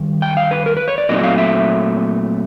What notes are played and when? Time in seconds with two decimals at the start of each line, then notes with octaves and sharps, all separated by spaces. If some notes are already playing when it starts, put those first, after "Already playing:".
Already playing: G2 D#3
0.22 G5
0.37 F5
0.51 B4
0.66 A#4
0.77 B4
0.88 C#5
0.98 D5
1.09 A#2 F#3 A3 C4 D#4 D#5
1.23 F5
1.38 E5